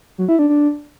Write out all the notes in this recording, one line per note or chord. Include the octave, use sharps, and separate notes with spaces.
F#3
E4
D4
D4